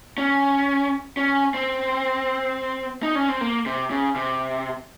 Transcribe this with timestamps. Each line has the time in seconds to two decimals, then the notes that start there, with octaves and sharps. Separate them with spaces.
0.18 C#4
1.17 C#4
1.54 C4
3.03 D#4
3.15 C#4
3.29 C4
3.41 A#3
3.66 C3
3.91 C#3
4.16 C3